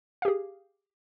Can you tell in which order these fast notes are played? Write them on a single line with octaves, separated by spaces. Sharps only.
F5 G4 G#4